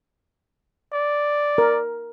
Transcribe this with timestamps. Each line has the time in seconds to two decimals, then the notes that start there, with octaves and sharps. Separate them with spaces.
0.93 D5
1.58 A#4